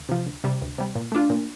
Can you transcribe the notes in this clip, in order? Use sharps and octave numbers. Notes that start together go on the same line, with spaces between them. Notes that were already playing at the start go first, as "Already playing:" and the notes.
Already playing: D2
C3 F3
D2
C3 G3
D2
C3 G3
A#2
A3 D4 F4
A#2